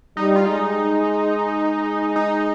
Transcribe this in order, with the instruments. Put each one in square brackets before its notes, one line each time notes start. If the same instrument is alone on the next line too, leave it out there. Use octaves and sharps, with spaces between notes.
[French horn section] G3 [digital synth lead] D#4
[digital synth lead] F4
[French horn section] G#3 [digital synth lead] D#4
[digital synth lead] D#4